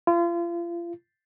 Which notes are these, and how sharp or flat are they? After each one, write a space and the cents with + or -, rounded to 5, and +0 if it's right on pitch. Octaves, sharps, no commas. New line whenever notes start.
F4 -35